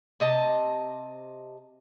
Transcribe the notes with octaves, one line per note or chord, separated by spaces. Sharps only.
C3 D#5 A5